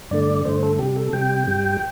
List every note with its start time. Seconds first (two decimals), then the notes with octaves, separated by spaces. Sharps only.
0.11 G2 D3 A3 D5
0.45 G2 D3 A3 C5
0.63 A4
0.79 C3 G3 G4
0.96 A4
1.13 C3 G3 G5
1.47 G2 G3